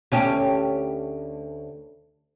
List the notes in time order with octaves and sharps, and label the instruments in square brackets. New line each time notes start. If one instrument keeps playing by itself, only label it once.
[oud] D2 C#4 G4